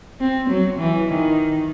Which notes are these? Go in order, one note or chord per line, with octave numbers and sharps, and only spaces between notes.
C4
F#3
E3
D#3